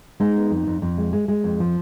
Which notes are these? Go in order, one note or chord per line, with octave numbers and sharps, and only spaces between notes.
G#3 D#4
B3
F2
F2
F2
G#3
G#3
G#3
F2
F3